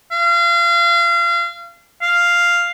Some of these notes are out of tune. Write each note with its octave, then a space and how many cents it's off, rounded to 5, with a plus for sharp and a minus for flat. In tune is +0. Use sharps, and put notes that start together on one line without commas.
F5 -30
F5 +0